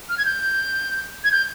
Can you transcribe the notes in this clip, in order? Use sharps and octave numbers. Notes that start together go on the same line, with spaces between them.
F6
G#6
G6
G#6
G6